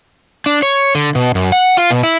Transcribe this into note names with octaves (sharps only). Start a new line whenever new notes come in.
D4
C#5
D3
B2
F#2
F#5
F4
B2
E4